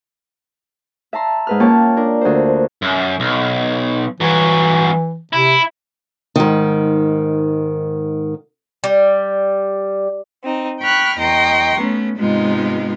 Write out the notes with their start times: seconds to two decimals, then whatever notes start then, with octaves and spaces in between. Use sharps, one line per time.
1.13 E5 A5 A#5 C6
1.47 G#2 B4 F6
1.60 A#3 C#4 F4 C#5 G5 A5
1.97 D4 A#4
2.21 D2 C5
2.82 F#2
3.20 B1
4.20 G2 E3 F#3
5.33 C3 E4
6.36 G#2 D#3
8.84 G3
10.43 C4 D#4
10.81 G5 B5 C#6 F6 F#6
11.18 E2 D#5 G5 A#5 C6 C#6
11.80 A3 B3 C#4
12.18 G#2 C3 G#3 B3 D#4 F4